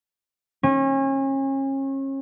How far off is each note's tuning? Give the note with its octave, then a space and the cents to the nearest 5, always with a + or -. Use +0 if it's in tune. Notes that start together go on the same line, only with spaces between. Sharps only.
C#4 -35